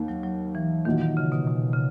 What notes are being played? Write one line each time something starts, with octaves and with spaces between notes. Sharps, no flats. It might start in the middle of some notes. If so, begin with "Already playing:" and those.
Already playing: D#2 D#3 A#3
F#3
F#3
E3
A#2 D#3 A#3 D#4 F#4
D#3
C#3
B2
B2
C#3